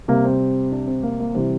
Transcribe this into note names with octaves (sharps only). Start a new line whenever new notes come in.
C3 G3 A#3
C4
D4
C4
A#3
A#3
C3 E3 G3 C4